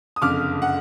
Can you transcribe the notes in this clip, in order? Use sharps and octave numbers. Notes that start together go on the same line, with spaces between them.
D#6
F#1 F2 D3 D6 F6
F#5